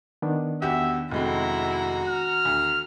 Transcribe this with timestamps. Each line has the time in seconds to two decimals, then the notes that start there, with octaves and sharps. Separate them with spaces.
0.22 D#3 B3 D4
0.62 E2 F#4 G4 E5
1.11 F1 G#3 C4 E4 F#4 A#5
2.09 F6
2.45 D2